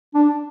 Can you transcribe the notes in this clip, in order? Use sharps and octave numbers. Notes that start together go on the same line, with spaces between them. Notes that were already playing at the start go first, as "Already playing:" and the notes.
D4